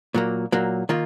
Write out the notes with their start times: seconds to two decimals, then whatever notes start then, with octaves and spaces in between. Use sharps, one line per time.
0.14 A#2 F#3 A#3
0.52 A#2 F#3 A#3
0.89 D#3 A#3 F4